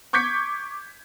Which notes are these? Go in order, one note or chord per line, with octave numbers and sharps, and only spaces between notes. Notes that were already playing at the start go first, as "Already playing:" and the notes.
C#6 D6 G6 G#6 B6 C#7